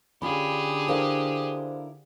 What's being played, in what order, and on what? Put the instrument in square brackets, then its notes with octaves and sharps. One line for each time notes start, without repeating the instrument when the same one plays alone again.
[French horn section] D3 [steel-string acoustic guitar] C#4 F4 [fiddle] G4 G#4 [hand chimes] B5
[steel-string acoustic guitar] D4 E4 A#4 [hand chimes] A4 C5 F5